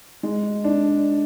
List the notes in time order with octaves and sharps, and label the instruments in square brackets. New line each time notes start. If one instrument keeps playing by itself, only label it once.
[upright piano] G#3
D4